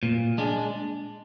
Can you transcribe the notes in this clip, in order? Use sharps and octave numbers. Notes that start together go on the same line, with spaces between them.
A#2
G#3 D4